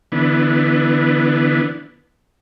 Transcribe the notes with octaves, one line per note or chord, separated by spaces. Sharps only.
D3 E3 B3